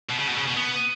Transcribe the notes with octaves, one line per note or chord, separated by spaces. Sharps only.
B2
C#3
B2
C#3
B2
B3